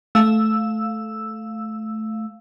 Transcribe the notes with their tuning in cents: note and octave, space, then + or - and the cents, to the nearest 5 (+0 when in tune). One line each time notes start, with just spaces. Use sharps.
A3 -10 F5 +0 E6 +0